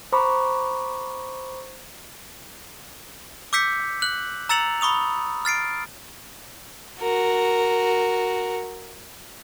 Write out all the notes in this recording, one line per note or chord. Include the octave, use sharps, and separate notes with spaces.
C5 A#5 B5 C#6 D6
D6 E6 G6 B6 C#7
F#6 F#7
A#5 E6 A6 C#7 F7 F#7
B5 C#6 D#6 F7
F6 A6 C7 D7
F#4 A#4